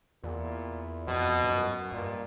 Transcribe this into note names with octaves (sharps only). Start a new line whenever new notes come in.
E2 A#2
F2 B2
G2
F#2
G2 A#2